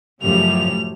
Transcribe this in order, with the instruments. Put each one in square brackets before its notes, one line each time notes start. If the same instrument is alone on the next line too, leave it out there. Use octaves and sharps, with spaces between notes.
[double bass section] F#2 F3 [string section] A2 C#3 G3 [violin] F7